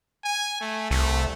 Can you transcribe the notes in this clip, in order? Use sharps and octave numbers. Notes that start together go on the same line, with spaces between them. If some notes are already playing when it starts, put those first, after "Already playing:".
G#5
A3
C2 A3